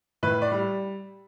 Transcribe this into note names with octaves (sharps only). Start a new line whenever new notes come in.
A2 B4
D5
G3